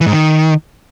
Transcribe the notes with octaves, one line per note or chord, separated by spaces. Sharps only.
E3
G#2
D#3